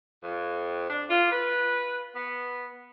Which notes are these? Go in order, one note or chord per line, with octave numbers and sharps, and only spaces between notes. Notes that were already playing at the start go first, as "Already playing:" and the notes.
F2
D4
F4
B4
B3